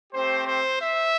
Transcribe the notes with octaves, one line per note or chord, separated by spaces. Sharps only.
A3 C4 G4 C5
C5
E5